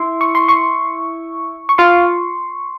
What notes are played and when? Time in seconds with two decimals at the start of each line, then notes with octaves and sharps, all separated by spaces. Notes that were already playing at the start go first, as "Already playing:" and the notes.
Already playing: E4 C6
0.21 C#6
0.35 C6
0.48 C#6
1.69 C#6
1.78 F4 C6